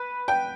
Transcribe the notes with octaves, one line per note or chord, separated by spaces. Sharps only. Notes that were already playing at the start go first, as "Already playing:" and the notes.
Already playing: B4
G5